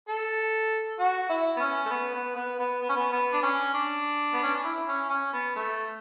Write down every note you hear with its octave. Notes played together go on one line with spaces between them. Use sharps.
A4
F#4
E4
B3
C#4
A3
B3
B3
B3
B3
B3
C#4
B3
B3
D4
C#4
D4
B3
C#4
D4
E4
C#4
C#4
B3
A3